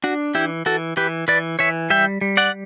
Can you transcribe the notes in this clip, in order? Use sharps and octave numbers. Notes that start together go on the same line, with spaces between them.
D4 F#4
E3 E4 G4
E3 F#4 A4
E3 G4 B4
E3 B4 D5
E3 C#5 E5
G3 E5 G5
G3
D5 F#5